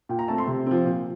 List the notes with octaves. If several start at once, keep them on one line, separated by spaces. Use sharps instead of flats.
A#2 G5
A#5
A3 C4 A5
C6
C3
F3 C4
A#2